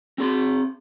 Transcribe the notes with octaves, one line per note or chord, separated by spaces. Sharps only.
C4 G#4 C6